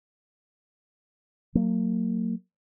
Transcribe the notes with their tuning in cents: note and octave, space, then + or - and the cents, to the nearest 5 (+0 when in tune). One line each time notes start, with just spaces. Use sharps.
F#3 +0 A#3 -30